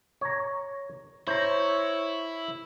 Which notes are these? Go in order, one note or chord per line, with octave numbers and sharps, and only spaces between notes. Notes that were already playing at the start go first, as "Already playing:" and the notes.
C#5 A#5
E4 C5 C#5 A#5